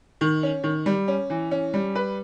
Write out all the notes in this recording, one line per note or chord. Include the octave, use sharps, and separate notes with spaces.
D#3
C#4
D#3
G3
C#4
E3
C#4
G3
B4